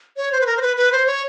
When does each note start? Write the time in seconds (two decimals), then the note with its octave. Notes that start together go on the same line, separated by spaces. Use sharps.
0.17 C#5
0.32 C5
0.41 B4
0.47 A#4
0.57 C5
0.62 B4
0.77 B4
0.92 C5
1.07 C#5